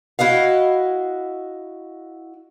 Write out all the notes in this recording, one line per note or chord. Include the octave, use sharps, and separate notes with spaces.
E4 F#4 D#5 F5